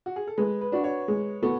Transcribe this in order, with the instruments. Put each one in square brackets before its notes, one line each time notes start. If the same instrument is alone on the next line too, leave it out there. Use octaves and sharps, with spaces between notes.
[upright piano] F#4
G#4
A4
[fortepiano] G#3 [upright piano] B4
[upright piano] B4
[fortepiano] D4 F#4
[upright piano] C#5
[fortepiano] G#3
B3 F#4 A4